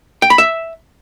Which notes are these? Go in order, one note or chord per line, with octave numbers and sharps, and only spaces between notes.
G5
B5
E5